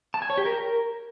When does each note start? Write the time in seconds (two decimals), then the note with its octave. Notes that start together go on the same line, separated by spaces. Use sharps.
0.14 A5
0.22 G#5
0.30 C#5
0.37 G4
0.45 A#4